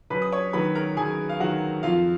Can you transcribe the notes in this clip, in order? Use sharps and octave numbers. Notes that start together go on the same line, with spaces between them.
F#2 B4 B5
D#6
C#5 C#6
D#3 F#3 B4 B5
A#4 A#5
F#2 G#4 G#5
F5
D#3 F#3 F#4 F#5
F2 F4 F5